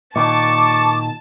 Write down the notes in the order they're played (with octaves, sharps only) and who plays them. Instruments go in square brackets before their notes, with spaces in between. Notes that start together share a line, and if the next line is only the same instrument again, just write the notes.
[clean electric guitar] A#2 D#3 [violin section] A5 [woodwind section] C#6 D6